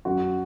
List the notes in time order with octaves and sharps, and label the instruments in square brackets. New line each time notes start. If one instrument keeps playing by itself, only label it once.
[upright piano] F#2 F#4